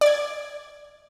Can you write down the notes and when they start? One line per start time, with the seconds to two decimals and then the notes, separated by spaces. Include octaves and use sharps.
0.01 D5 G#6